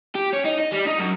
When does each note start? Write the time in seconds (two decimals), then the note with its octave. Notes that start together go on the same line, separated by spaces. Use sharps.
0.15 G4
0.33 C#4
0.46 D#4
0.60 D#5
0.73 G3
0.88 D#4
1.00 F#2